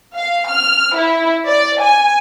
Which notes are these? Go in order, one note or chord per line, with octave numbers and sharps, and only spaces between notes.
F5
F6
E4
D5
G#5